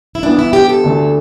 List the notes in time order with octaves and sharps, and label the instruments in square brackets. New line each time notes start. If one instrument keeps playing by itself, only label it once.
[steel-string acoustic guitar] E4
[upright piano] G2 E3 B3 [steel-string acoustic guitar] D4
[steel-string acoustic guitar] E4
G4
A4
[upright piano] D2 D3 A3 D4